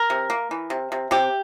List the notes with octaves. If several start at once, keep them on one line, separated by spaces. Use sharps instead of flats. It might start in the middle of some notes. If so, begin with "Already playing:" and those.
Already playing: A#4
C3
A#3
E3
C3
C3
C3 G4